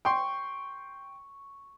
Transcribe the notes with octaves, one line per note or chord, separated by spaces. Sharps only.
G5 C6 C#6